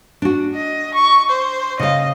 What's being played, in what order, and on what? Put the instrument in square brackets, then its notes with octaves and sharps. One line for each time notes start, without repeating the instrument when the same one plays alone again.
[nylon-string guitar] D4 F#4
[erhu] D#5
C#6
C5
[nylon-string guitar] C#3 F5 [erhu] D#5